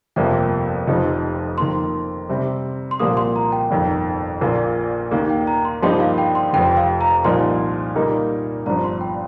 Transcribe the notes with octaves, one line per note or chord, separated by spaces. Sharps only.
G1 F2 C3 F3 A#3 G5
F1 F2 F3 D#4
F2 D#3 A#3 C6
C3 G3 C4
C6
C2 A#2 F3 A#3 D#6
C6
A#5
G5
G1 F2 D#3
A#1 A#2 A#3 F4
D#2 D#3 A#3
G5
A#5
C6
G2 F3 A#3 D#4 G4 C6
F5
G5
C6
F1 F2 F3 G5
F5
A#5
C2 A#2 F3 D#4 A#4 C6
A#2 G3 A#3 D#4 A#4
G1 G2 F3 A#5
C6
G5